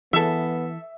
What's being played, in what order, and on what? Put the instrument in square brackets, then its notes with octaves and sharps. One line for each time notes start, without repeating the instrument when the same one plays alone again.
[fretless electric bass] E3 [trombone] B3 [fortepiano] A4 E6 [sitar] E5